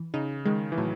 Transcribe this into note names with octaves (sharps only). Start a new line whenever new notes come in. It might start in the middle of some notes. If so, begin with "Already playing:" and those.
Already playing: E3
C#3 D#4
D#3 G#3
E3
A2 F#3